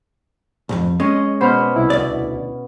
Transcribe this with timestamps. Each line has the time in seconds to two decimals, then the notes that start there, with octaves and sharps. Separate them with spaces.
0.69 B1 F2
1.00 G#3 C#4 D#5
1.41 B2 C5 B5 F6
1.76 C2 E4
1.90 D2 D5